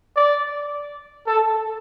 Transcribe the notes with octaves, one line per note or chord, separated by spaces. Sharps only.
D5
A4